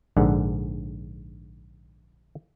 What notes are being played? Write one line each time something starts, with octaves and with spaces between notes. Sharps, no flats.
A#1 G#2 D3 F#5